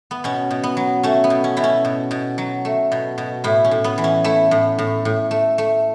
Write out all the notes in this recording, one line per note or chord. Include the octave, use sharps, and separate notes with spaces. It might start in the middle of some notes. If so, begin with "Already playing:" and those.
B3
B2 C#4
B2
B3
F#3
A3 C#4
B3
B2
C#4
B2 E4
C#4
B2
B2
F#3
A3
B2
B2
A2 E4
C#4
A2
B3
E3
C#4
A3 E4
A2
A2
A2
A3
A3